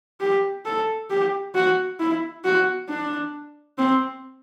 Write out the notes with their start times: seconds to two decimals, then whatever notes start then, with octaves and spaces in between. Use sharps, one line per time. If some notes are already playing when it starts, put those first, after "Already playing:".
0.20 G4
0.66 A4
1.10 G4
1.55 F#4
2.00 E4
2.44 F#4
2.89 D4
3.79 C4